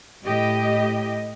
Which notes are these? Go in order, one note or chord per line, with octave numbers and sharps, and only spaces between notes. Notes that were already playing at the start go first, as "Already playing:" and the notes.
A2 G4 D#5